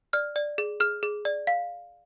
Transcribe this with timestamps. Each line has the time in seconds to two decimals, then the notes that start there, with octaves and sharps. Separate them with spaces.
0.13 D5 F6
0.36 D5
0.58 G#4
0.80 G#4 F6
1.03 G#4
1.25 D5
1.47 F5